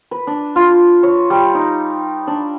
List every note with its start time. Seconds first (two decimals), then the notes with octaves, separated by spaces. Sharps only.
0.11 B4
0.27 D4
0.56 F4
1.03 C#5
1.30 G3
1.55 D#4
2.27 D4